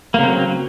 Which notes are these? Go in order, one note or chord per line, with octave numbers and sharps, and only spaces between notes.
C#3 F#3 A#3 C4